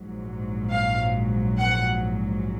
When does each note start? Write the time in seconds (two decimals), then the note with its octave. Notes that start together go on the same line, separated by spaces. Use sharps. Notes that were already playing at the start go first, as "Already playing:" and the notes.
Already playing: A#1 G#2 F#3
0.70 F5
1.58 F#5